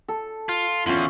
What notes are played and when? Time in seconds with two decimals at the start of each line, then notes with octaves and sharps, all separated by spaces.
0.08 A4
0.49 F4
0.86 E2 C#4 F4